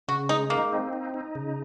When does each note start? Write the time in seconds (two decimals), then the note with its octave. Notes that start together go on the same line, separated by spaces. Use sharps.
0.08 C#3 F#4
0.29 G#3 D#4
0.50 A#3 D#4
0.73 C4
0.93 D#4
1.14 D#4
1.35 C#3